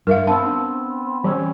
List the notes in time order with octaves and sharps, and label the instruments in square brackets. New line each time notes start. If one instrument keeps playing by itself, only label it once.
[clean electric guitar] G2 [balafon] A#4 E5 F5
[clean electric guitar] B3 C4 [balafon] D4 F5 A5
[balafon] D4
[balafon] E3 [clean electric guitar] G3 C4 C#4